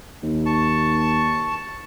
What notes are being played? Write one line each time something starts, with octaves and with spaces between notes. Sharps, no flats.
D#2
A5 C#6